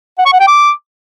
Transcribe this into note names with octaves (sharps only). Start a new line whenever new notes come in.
F#5
C#6
F#5
G5
D6